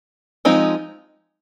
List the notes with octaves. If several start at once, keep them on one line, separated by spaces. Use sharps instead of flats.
F3 G#3 C4 D#4